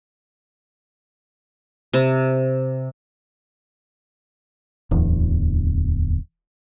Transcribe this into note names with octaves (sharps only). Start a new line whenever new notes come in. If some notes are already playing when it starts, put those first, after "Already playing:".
C3
D1 E2